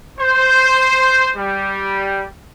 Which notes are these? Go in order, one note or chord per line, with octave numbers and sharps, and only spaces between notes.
C5
G3